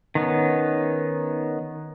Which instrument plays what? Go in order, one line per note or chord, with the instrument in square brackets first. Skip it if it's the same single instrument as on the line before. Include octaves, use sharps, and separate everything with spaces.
[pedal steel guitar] D#3 B3 C#4